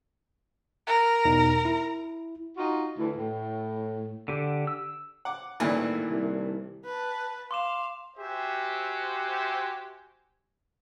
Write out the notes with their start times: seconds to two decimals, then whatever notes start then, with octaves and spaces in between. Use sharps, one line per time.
0.87 A#4
1.25 E2 B2 D#4
1.65 E4
2.57 D#4 F4 F#4
2.98 D2 E3
3.15 A2
4.28 D3 G4
4.67 E6
5.25 F#5 D6
5.60 A1 G2 A#2 D#3 E3 A3 E4
6.10 C2
6.85 B4 A5
7.51 F5 C6 D6 E7
8.16 F#4 G4 C5 E5 G#5